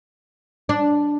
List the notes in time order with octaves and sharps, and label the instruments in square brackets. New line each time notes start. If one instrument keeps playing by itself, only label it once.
[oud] D4